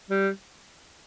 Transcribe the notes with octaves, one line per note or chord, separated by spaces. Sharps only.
G3